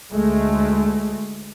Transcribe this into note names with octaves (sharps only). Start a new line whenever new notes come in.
D2 G#3 A3